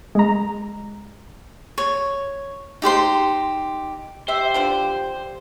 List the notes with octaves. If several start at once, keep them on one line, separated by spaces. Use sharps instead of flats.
G#3 A#5
C#5
D#4 G4 C5 C6
G4 C5 E5
D3 F3 D4